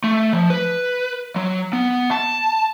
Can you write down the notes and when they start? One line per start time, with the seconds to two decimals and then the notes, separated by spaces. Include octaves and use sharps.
0.04 A3
0.33 F3
0.50 B4
1.36 F#3
1.73 B3
2.11 A5